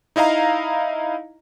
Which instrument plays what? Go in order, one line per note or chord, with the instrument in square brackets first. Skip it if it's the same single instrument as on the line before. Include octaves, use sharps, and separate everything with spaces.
[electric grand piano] D#4 E4 D#5 F5 A#5